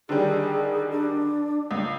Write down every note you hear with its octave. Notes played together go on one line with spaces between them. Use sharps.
D3 D#3 G3 G#4
D4
C#2